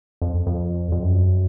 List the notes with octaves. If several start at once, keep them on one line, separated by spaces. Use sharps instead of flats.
F2
F2
F2
F#2